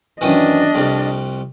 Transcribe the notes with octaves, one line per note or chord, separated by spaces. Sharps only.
F#2 D#3 E3 D4 D#5
C2 F2